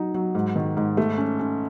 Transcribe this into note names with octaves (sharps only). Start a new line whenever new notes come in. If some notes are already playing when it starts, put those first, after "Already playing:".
Already playing: F#3 D#4
F#3
G#2
D#3
G#2
A3
C#4
C#4